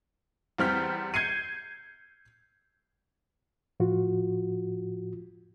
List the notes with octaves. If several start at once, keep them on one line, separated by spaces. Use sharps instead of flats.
E2 G3 C4 F6 G6 B6
G6 G#6 C7 C#7 D#7
A2 F3 F4 F#4